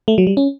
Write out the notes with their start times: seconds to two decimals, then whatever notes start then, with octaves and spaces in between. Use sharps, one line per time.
0.08 A3
0.18 F#3
0.27 G3
0.37 C#4